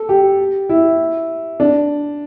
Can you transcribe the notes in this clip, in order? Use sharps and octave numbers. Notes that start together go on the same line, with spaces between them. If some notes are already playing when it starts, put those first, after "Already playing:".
Already playing: A4
G4
E4
D4